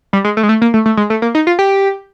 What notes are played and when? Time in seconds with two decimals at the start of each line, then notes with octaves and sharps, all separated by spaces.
0.13 G3
0.25 G#3
0.37 A3
0.43 G#3
0.49 A3
0.62 A#3
0.74 A3
0.86 A3
0.97 G#3
1.10 A3
1.22 A#3
1.35 D#4
1.47 F4
1.59 G4